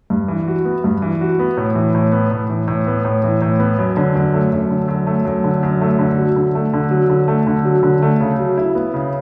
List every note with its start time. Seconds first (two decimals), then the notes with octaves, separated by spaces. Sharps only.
0.10 G2
0.28 E3
0.48 F#4
0.65 B3
0.84 G2
1.02 E3
1.21 F#4
1.39 B3
1.57 A2
1.75 E3
1.95 A2
2.12 B3
2.31 A2
2.50 E3
2.68 A2
2.87 B3
3.05 A2
3.24 E3
3.42 A2
3.59 B3
3.79 F#2
3.97 D3
4.15 F#2
4.34 A3
4.52 F#2
4.70 D3
4.88 F#2
5.07 A3
5.25 F#2
5.44 D3
5.63 F#2
5.81 A3
5.99 D3
6.18 F#3
6.36 D3
6.55 A3
6.73 D3
6.91 F#3
7.10 D3
7.28 A3
7.47 D3
7.65 F#3
7.83 D3
8.02 A3
8.20 C#3
8.39 F#3
8.57 E4
8.75 B3
8.94 C#3